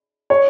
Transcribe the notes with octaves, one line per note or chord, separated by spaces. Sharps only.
C#5